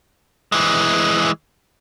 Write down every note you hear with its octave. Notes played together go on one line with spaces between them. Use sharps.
E3 G#3